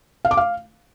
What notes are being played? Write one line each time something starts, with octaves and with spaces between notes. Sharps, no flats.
F5
D6
F5